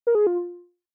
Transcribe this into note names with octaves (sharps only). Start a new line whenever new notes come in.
A#4
G#4
F4